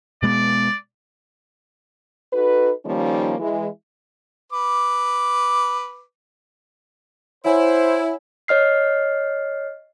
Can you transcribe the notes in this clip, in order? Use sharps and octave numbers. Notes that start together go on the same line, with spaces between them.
B2 G#3 B3 D5
D#4 F#4 A4 B4
D#3 F3 G3 A#3 C#4 D#4
E3 G#3 E4
B4 D6
E4 C5 C#5 F#5 G#5
C#5 D#5 F6 C7